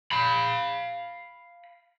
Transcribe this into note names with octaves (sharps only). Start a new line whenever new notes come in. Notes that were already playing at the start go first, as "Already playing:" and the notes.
F5 B5